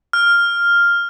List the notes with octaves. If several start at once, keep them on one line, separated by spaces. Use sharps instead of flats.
F6